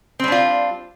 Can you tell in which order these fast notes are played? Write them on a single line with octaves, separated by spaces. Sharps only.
C4 G3 D4 F4